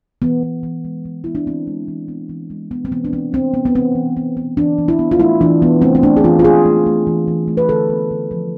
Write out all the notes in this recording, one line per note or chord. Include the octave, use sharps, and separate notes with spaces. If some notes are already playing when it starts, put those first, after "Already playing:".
E3 B3
B3
E3
G#3
E3
B3 E4
D4
E3 C4
G#3
E3
B3
E3
G#3
B3
C4
E3 B3
D4
E3 C4
B3 C4
B3
B3
E3 C4
E3
B3
B3
E3 D4
E3
E4
B3
F4
A3 E4
E3 D4
E3 B3
A3 C4
C4
A3 D4
G#4
E3 F4
F4
E3 G#4
A3
A3
E3
E3
A3
B4
D3 A4
B3
D3
F3